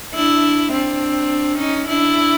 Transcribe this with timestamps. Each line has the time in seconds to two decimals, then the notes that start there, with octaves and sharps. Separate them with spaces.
0.14 D4 E4
0.72 C4 D4
1.59 C#4 D#4
1.88 D4 E4